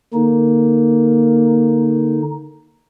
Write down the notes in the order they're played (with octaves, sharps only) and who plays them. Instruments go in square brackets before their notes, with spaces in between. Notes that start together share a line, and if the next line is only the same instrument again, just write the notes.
[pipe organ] D3 D#4 [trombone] A#3